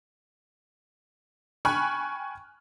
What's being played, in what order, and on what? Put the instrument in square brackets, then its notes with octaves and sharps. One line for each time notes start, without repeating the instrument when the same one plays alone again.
[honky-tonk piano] G5 G#5 B5 C#6 F6 F#6